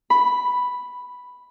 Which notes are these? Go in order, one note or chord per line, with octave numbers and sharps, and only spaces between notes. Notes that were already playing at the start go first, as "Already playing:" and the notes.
B5